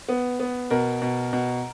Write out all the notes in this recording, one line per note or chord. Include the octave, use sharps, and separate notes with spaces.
B3
B3
B2 A#4
B2
B2